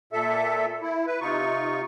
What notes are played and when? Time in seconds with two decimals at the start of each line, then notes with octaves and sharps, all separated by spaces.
0.13 A#2 A4 E5
0.81 E4
1.07 B4
1.21 C3 D#4 F4 C#6